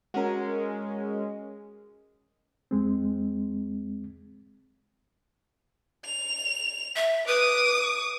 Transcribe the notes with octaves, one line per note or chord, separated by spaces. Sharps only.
G#3 C#4 F#4 A#4
E2 G#3 C4
F7
E5
B4 D6 D#6